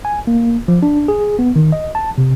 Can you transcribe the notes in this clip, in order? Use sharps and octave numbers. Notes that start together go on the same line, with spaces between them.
G#5
A#3
F3
D4
G#4
B3
D#3
D#5
A5
C3